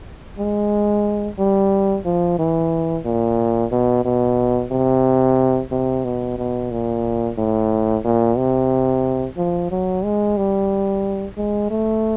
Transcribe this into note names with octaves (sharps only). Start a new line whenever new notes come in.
G#3
G3
F3
E3
A#2
B2
B2
C3
C3
B2
B2
A#2
A2
A#2
C3
F3
F#3
G#3
G3
G#3
A3